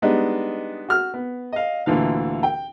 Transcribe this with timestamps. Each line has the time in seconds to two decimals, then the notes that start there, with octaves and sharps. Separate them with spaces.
0.02 G3 G#3 B3 D4 D#4
0.89 F#4 F6
1.14 B3
1.53 D#5 F5
1.86 D2 A#2 D3 E3 F5
2.43 G5